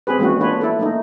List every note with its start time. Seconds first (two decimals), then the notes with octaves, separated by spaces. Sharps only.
0.07 C4 G4 G#4 B4
0.19 E3 G#3 A#3 C#4 F#4
0.41 A#3 B3 D4 F4 B4 C#5
0.61 E4 A4
0.79 A3 A#3 D#4